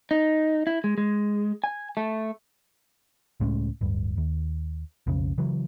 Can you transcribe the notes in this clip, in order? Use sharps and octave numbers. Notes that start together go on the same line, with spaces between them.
D#4
E4
G#3
G#3
G#5
A3
C#2 A2 G#3 C#4
D1 G2
D#2
B1 F2 C#3
C#3 E3 F#3